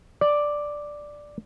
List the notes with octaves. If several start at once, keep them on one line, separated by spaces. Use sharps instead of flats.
D5